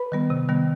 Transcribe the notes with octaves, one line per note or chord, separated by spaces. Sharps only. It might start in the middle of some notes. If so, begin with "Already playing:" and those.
Already playing: B4 B5
D#3 G3 B3
C3
D#3 G3 B3